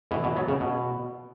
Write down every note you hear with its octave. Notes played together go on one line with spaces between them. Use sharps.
B2 E3
B2 E3
F#3 B3
C#3
B2